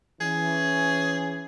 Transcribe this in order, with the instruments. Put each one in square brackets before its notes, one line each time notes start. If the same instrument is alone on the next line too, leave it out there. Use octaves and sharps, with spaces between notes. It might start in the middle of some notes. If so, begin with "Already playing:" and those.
[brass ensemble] E3 C#4 [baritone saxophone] G#4